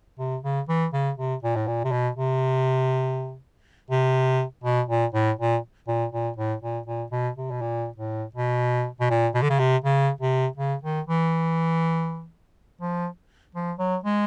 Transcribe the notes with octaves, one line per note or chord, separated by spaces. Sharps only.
C3
C#3
E3
C#3
C3
A#2
A2
A#2
C3
B2
C3
C3
B2
A#2
A2
A#2
A#2
A#2
A2
A#2
A#2
B2
C3
B2
A#2
A2
B2
B2
A#2
B2
D3
C#3
C3
C#3
C3
C#3
D#3
E3
F3
F3
F#3
G#3